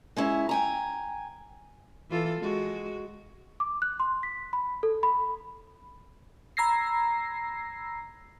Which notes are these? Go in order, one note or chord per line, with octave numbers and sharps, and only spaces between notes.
G#3 C#4 E4
G5 G#5 A#5
E3 F4 A4
G#3 F#4
D6
F#6
C6
B6
B5
A4
B5
A#5 B5 E6 G#6 A#6 C7